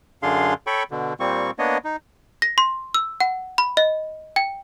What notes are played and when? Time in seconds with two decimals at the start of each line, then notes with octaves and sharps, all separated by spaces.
0.23 F#2 D3 D4 G#4 F5 C6
0.67 A4 C#5 G5 B5 C#6
0.91 B2 D3
1.20 A#2 G3 A#3 C4 C#6
1.59 A#3 B3 D4 C#5 D#5
1.85 D#4
2.42 A#6
2.58 C6
2.94 E6
3.20 F#5
3.58 B5
3.77 D#5
4.36 G5